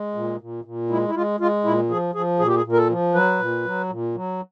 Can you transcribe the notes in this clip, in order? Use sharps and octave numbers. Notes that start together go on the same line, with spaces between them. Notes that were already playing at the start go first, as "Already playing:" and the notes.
Already playing: G#3
A#2
A#2
A#2
G#3 E4
E4
G#3 F4
G#3 F4
A#2 E4
F3 G#4
F3 G#4
A#2 G#4
G4
G#4
A#2
A#4
A4
F3
F#3 B4
A#2
F#3
A#2
F#3